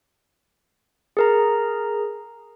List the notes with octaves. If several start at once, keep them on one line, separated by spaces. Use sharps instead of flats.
G#4 A#4 A#5